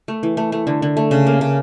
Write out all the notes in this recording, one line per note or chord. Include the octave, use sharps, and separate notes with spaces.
A3
E3
A3
A3
D3
D3
A3
C#3
A#3
C#3